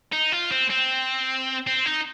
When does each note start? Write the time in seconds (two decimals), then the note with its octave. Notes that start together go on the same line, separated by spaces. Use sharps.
0.12 D#4
0.32 F4
0.51 C4
0.70 C4
1.67 C4
1.86 D#4